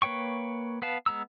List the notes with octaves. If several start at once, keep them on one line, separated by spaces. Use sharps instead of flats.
A#3 B4 C#5 G5 C#6
B3 B4 F5 A5
G#3 B3 A#5 E6